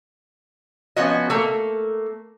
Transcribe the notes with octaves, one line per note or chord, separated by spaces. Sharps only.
F3 B3 C#4 F#4 D#5
A3 A#3